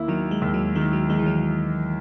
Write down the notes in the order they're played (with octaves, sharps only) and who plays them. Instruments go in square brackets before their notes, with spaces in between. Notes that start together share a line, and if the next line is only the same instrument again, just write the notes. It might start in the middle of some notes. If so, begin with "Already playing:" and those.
Already playing: [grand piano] D#2 A#3 E4
[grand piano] D#3 [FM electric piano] F#3
[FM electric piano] G#3
[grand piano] D#2
[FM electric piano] F#3
[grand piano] D#3 [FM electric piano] G#3
[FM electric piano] F#3
[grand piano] D#3 [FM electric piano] G#3
[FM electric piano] E3
F#3